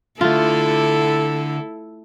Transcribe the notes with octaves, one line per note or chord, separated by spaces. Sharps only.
D3 A3 E4 F4 A4